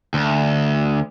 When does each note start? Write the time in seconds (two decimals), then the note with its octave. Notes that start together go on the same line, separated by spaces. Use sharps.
0.14 D2